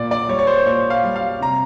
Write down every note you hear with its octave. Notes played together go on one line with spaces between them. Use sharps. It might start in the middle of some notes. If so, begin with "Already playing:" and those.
Already playing: A#2 D5
D5
G3 C#5
C#5
C5
A#2 C#5
F5
G3
F5
C3 A#5